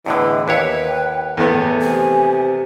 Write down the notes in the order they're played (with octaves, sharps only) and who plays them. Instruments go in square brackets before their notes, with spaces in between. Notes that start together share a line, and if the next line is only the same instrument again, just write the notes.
[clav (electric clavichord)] E2 A2 D3 [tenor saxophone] E3 [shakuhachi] D#5
[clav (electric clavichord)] D#2 E4 C#5 [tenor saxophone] B4 [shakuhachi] G5
[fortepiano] E2 A3 B3 [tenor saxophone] A2
[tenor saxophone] C3 [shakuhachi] G#5